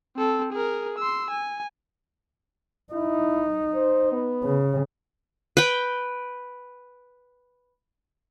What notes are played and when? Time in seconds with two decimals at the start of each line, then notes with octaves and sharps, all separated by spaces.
0.17 C4 A4
0.52 G#4 A#4
0.98 C6 E6
1.30 G#5
2.93 D#4 E4
3.75 C5
4.12 B3
4.44 C#3
5.57 B4 G5